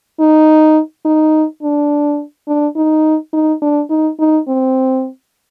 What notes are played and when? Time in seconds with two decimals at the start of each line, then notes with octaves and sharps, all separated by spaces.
0.20 D#4
1.05 D#4
1.63 D4
2.48 D4
2.76 D#4
3.33 D#4
3.62 D4
3.90 D#4
4.19 D#4
4.48 C4